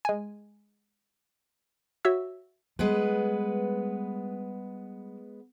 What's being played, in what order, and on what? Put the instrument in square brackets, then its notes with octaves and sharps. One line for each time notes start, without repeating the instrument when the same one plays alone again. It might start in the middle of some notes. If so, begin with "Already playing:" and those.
[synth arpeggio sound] G#3 G#5
F#4 C#5 E5 E6
[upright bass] G3 [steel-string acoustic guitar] G#3 B3 B4